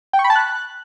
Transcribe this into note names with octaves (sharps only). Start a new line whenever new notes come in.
G5
C#6
B5
A5
F#6